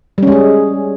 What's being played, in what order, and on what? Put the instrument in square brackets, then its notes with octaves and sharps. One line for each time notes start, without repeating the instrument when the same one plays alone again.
[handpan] G3
C#4
G#3
G#4